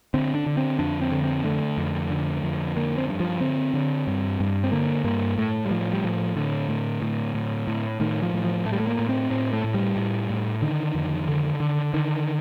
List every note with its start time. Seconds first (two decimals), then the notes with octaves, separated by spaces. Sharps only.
0.14 D3 C4
0.35 D4
0.46 D3
0.57 C4
0.79 F2 D4
1.01 C4
1.12 D3
1.23 C4
1.44 D3 A3
1.77 F2
2.10 D3
2.43 F2
2.76 D3 A#3
2.98 C4
3.08 G2
3.20 F3
3.41 D3 C4
3.74 D3
4.07 G2
4.40 G2
4.64 C4
4.72 D3 A#3
5.04 G2 A#3
5.38 A2 A3
5.66 G3
5.71 A2 F3
5.93 G3
6.04 A2 F3
6.36 A2 D3
6.69 A2
7.02 A2
7.34 A2
7.68 A2
8.00 A2 D#3
8.22 F3
8.33 A2
8.44 F3
8.65 A2 A3
8.73 G3
8.80 A3
8.87 A#3
8.99 A2
9.09 C4
9.30 A2 C4
9.53 A3
9.64 A2
9.74 G3
9.96 A2
10.30 A2
10.62 D3 D#3
10.94 F2
11.28 D3
11.60 D3
11.94 D3 D#3